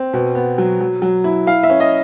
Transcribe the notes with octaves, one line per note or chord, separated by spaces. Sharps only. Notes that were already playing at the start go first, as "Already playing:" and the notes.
Already playing: C4
B2
B3
F#3
F#3
F#3
E4
E4 F5
E5
C#4
D#5